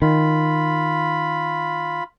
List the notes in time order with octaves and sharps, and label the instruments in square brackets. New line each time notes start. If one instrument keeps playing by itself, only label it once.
[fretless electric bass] D#3 [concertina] F4 B5